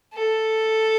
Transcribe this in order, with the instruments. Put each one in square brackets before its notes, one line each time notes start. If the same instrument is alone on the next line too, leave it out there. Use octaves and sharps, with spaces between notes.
[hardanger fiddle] A4